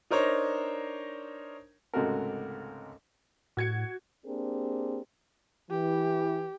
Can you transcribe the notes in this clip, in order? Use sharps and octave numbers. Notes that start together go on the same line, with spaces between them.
D4 D#4 A#4 C5 C#5
C#2 G#2 C3 A3 F#4 A#4
A2 F#4 G#6 C#7
A#3 C4 D4 G4 G#4 A#4
E3 G4